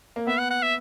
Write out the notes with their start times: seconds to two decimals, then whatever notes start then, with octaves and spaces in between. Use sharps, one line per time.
0.16 A#3
0.27 B3 E5
0.39 F#5
0.50 F#5
0.63 E5